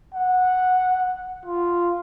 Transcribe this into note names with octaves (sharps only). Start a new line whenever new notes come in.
F#5
F4